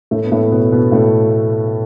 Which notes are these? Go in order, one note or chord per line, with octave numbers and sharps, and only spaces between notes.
A2 A3
B3
A2 A3
B2 B3
B2 B3
A2 A3